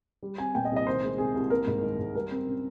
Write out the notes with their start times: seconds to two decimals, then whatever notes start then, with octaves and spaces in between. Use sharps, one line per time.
0.23 G3
0.38 C4 G#5
0.55 A#2 G5
0.65 D#5
0.71 C2
0.76 D#5
0.87 D#3 C5
1.03 G#3
1.18 C3 G#4
1.35 C2
1.50 A#3 A#4
1.67 G#2
1.82 D#3
1.99 G#2
2.15 G3 A#4
2.31 C4
2.47 C#3